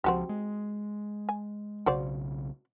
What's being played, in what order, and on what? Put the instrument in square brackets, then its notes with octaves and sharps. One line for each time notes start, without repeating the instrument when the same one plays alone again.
[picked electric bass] C#2 F3 [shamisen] C4 F#4 G4
[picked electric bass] G#3
[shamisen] G#5
[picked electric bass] B1 C#3 [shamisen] F#4 C5 D5